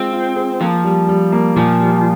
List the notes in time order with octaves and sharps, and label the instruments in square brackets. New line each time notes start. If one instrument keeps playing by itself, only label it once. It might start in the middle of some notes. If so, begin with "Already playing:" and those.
Already playing: [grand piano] G#3 F4 [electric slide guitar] C4
[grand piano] F4
G#4
[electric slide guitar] F3 [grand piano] A#3
[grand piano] G3
G3
A#3
[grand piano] A#2 [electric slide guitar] F3
[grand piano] G3